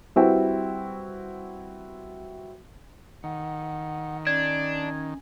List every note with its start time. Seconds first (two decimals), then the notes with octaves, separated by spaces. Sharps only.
0.16 G3 C4 E4 F#4 B4 G5
3.24 D#3 F#5
4.27 C#4 D4 G#6